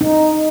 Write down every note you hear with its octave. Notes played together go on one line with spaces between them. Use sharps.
D#4